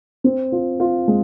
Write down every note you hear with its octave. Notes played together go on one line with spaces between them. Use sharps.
C4
F4
F4
G#3